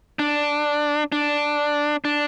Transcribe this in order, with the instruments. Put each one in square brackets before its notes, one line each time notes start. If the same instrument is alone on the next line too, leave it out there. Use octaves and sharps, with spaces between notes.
[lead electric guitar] D4
D4
D4